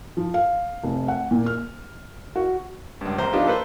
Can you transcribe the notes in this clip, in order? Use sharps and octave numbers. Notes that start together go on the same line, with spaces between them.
F3
F5
F1
F#5
A#2
F6
F#4
C#2 G2
A1 E2 C5 A#5
F3 B3 D4 D#4 F4 G4
A#3 A4 B4 C5